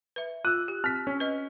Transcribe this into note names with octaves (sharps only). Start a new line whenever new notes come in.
B4 E5
F4 E6 F#6
G4
C4 F6 B6
C#4
B4 D#5